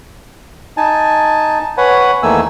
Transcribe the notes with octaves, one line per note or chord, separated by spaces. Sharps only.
D#4 G#5 A5
B4 C#5 F#5 G#5 B5
E2 D#3 A3 A#3 G#5 E6